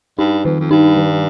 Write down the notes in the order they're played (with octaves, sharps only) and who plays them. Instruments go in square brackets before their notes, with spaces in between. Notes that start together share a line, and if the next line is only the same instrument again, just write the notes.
[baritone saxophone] G2 [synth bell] D#4
[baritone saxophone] F2 [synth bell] D#3
[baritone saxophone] F2
[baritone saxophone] G2 [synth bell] D#4
[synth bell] D#3